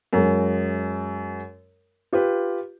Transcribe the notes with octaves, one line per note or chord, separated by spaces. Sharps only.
F#2 G#3
F4 G4 B4